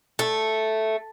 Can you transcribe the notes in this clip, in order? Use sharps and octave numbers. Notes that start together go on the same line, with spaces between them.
A3